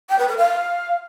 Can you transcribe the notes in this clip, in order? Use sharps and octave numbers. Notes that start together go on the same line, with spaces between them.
G5
B4
A#4
F5